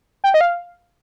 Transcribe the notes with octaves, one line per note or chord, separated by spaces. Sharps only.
G5
D#5
F5